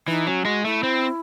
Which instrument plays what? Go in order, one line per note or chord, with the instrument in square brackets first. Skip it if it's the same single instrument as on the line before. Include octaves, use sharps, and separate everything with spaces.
[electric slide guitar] E3 [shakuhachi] D#4
[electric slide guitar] F#3 [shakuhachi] C#4
[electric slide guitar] G#3 [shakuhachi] F#4
[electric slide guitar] A3 [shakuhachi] E4
[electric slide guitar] C4